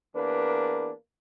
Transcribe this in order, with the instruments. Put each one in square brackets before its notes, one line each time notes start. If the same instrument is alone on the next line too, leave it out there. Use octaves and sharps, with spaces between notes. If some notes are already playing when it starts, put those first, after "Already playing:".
[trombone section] E2 A#3 D4 A#4 B4